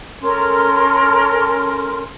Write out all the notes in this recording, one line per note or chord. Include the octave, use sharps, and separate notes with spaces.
C#4 A4 A#4 C6